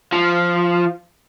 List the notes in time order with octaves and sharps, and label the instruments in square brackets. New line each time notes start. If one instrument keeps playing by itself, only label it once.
[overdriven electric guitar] F3